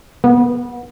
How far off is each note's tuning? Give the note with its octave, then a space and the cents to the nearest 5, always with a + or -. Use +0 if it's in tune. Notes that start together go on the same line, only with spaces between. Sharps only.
B3 -30